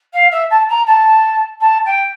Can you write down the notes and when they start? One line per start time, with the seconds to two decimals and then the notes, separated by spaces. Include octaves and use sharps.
0.14 F5
0.32 E5
0.50 A5
0.69 A#5
0.87 A5
1.61 A5
1.86 G5